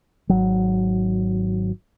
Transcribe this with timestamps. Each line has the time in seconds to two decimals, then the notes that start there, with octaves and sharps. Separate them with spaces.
0.29 G#1 F#3